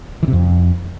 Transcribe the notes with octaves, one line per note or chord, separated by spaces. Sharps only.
E3
C3
F2